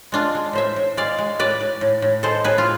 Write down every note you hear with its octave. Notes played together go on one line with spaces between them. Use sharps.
G#3 D4 F4
G#3
A2 C5 E5
A2
G#3 D5 F5
G#3
A2 B4 D5
A2
A2
A2
G#3 A4 C5
A2 G#4 B4
F4